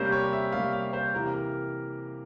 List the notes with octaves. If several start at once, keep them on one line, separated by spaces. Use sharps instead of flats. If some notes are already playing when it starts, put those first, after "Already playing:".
Already playing: C3 G3 A#3 C#4 C5
C#5
E5
C3 G3 A#3 C#4 F5
F5
C5
C3 E3 A#3 A#4
A#4